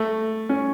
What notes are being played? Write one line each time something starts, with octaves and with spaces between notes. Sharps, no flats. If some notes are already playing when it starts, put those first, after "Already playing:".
Already playing: A3
C#4